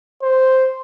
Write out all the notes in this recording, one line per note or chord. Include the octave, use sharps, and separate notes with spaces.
C5